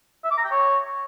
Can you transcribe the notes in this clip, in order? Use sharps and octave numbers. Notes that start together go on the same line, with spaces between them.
E5
D6
A#5
G5
C#5